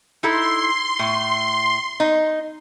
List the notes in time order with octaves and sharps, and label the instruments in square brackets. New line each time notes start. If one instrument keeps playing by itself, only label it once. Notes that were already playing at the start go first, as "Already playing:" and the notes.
[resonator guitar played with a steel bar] D#4 E4 A4 [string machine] C6
[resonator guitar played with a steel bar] A2
D#4